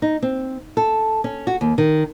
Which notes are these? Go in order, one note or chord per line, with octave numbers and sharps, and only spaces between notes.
D#4
C4
A4
C#4
F#4
D#2
D#3